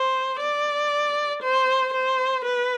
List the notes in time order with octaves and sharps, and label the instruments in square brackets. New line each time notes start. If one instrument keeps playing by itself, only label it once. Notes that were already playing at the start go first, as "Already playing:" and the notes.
Already playing: [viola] C5
D5
C5
C5
B4